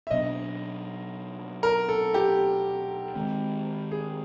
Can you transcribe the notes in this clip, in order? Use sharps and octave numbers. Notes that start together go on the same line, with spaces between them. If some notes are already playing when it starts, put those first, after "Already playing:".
E5
B2 F#3 B3 D4 D#5
A#4
A4
G4
D#3 G#3 C4
G#4